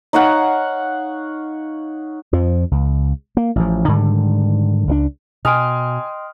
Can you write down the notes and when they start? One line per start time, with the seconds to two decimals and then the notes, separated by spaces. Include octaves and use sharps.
0.13 D#4 C#5 F5 F#5
2.33 F2 F3
2.71 C#2
3.37 A#3
3.56 A1 F3
3.88 G#2 D3 D#3 G3
4.88 C#2 F3 D4
5.45 B2 D#5 G5 G#5 C6 D#6 F6 D7